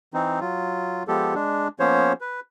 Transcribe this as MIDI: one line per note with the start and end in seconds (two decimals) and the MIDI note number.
0.14 0.40 52
0.14 0.40 60
0.14 0.40 63
0.40 1.03 54
0.40 1.03 65
1.08 1.34 53
1.08 1.34 56
1.08 1.34 59
1.08 1.34 67
1.08 1.34 69
1.34 1.68 56
1.34 1.68 62
1.80 2.13 53
1.80 2.13 58
1.80 2.13 59
1.80 2.13 61
1.80 2.13 72
1.80 2.13 73
2.21 2.40 71